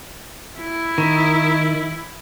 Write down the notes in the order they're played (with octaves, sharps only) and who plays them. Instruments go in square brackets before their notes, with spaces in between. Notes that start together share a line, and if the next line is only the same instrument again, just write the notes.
[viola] E4
[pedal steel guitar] D#3